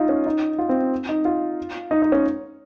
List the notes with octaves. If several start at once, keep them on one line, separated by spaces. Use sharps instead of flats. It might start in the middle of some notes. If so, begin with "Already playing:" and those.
Already playing: D#4 F4
C#4
D#4
F4
C4
D#4
F4
D#4
D#4
C#4